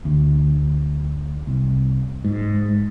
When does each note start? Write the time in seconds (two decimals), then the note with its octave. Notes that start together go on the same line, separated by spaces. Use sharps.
0.05 D2
1.47 C2
2.24 G#2